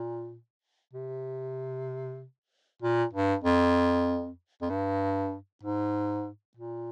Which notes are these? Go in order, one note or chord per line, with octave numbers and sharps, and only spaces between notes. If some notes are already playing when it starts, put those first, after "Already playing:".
Already playing: A#2
C3
A#2
G2
F2
F2
G2
G#2
A#2